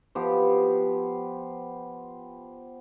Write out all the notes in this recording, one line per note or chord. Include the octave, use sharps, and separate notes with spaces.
F3 B3 G4